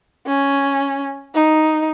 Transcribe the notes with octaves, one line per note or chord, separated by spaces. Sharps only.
C#4
D#4